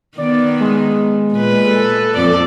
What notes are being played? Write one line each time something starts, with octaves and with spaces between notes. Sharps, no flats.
D#3 B3 D5
G#3
A#2 B4
A4
F2 D5 D6